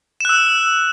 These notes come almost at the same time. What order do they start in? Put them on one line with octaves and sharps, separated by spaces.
E7 F#6 E6